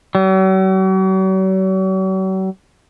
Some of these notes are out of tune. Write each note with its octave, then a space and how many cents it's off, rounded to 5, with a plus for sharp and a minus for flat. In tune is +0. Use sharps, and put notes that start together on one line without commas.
F#3 +45